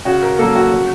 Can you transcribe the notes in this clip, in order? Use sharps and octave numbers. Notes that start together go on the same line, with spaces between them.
C#3 F#4
A#4
F#3 A#3 A4
F#4
C#3